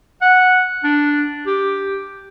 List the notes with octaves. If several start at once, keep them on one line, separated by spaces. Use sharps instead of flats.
F#5
D4
G4